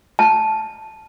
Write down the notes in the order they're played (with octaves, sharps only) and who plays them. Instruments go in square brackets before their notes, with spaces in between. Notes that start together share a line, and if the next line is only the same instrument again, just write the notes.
[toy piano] A5